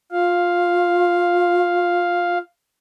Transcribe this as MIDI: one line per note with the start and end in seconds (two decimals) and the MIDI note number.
0.11 2.39 65
0.11 2.38 77